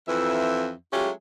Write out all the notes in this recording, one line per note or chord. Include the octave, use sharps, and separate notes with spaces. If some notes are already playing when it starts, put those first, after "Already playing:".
F2 E3 E5
F#3 G#3 A3 C#4 F4 G4